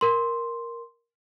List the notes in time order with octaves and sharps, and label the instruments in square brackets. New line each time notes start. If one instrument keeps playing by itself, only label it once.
[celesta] A#4 C6